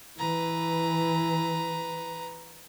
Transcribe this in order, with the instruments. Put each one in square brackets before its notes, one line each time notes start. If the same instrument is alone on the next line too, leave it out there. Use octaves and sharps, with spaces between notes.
[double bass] E3 [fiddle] B4 A#5